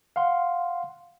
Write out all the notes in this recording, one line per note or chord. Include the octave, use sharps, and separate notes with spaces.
F5 F#5 C6